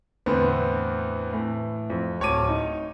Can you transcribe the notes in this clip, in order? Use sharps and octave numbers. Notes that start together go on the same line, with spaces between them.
E2 A2 D3 B3 C4
A2 E3
F2
D1 C#5 A5 D6 D#7
D#4